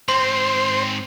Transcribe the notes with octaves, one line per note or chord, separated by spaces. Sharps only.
G#2 C4 C5 C6